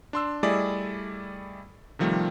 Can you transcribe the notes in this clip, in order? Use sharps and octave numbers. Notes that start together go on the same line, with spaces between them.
D4 C6 E6
G3 A3 E4 G#4 D5 D#5
C3 D#3 F3 G3 A3